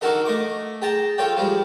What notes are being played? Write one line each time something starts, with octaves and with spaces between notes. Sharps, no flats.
D4 D#4 F#4 A4 A#4 D#5
A3 D#5 C#6 D6
G#4 G5 A5 A#5
F4 A4 C#5 D5 G5
F3 G3 G#3